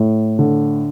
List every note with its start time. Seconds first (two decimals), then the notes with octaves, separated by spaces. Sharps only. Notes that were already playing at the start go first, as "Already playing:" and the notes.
Already playing: A2
0.39 D3